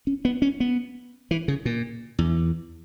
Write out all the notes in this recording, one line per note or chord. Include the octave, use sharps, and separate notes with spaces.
C#4
B3
C#4
B3
E3
C#3
A#2
E2